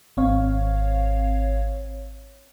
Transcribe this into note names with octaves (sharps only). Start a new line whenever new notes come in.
G#1 C4 C#5 F5